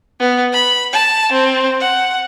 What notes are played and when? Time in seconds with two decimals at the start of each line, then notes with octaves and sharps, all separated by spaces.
0.19 B3
0.53 B5
0.93 A5
1.32 C4
1.80 F#5